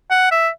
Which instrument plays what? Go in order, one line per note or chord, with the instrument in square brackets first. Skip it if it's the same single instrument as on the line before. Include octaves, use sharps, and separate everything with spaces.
[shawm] F#5
E5